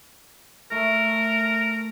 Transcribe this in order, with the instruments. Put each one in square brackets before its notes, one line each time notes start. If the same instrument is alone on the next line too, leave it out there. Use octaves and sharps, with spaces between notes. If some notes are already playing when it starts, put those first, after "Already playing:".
[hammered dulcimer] A3 [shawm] A#4